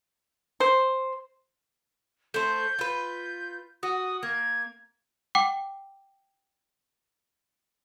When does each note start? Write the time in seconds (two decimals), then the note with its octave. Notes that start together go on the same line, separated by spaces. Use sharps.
0.60 C5
2.34 A3 C5 G6
2.79 F4 B4
3.83 F#4 D#6
4.23 A#3 G#6
5.35 F#5 G5 D6